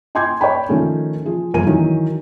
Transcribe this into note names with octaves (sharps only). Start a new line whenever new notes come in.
G5 G#5 C6 D6 G6 G#6
C#5 D5 G5 B5
D#3 F3 A3 C#4
F3 G#4
G1 F2 A#4 G#5 D#7
D#3 E3 F#3